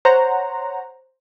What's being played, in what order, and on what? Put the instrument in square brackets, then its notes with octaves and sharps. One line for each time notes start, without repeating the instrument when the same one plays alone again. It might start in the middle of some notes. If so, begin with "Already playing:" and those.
[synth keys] C5 C#5 F#5 A#5